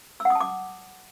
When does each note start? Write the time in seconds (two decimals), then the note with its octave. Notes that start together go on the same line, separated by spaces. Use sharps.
0.20 E6
0.25 F#5
0.30 D#6
0.35 A5
0.41 D6